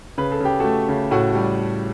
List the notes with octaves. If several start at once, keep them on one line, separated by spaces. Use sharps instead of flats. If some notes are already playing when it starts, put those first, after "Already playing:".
C#3 B4
A4
C#3 G4
A3 F#4 A4
C#3
A2 F#4 A4
G3